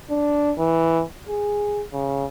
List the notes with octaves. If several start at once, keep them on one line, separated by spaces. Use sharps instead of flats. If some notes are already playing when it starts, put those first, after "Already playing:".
D4
E3
G#4
C#3